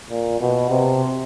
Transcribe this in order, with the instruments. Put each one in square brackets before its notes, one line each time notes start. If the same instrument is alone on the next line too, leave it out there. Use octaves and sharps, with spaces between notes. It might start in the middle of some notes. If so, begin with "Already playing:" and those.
[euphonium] A#2
B2
C3